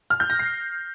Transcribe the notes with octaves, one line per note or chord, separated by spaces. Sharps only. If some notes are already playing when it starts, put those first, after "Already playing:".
F6
G6
A#6
C7